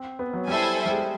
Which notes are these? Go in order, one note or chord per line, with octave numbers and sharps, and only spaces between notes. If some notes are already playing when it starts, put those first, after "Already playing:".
Already playing: C4
B3
F#3
G3 E4 A4 C5 E5 G#5
G3
G#3